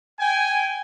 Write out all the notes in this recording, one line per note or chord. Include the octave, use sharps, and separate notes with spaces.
G5 G#5